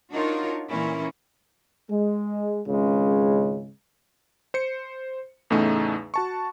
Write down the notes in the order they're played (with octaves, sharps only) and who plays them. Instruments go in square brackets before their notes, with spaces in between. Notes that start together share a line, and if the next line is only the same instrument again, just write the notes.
[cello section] D4 D#4 F4 F#4 A#4 C#5
A#2 E3 A#3 C#4 E4
[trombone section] G#3
G#1 C#2 C#3 G#3
[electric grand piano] C5 C#7
E2 A2 C#3 A3 D#4
F#4 A5 C#6